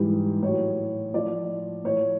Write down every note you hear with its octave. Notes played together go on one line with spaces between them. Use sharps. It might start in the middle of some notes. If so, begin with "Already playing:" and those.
Already playing: G#2 E3 G3
A2 F#3 C#5
A2 F3 D5
A2 F3 C#5